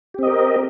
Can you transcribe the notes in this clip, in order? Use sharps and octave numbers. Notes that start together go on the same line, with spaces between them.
C4 G4 A#4 D#5